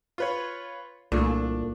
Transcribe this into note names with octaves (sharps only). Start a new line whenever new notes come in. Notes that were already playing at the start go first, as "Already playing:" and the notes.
F4 B4 C#5
C2 A#2 A3 D4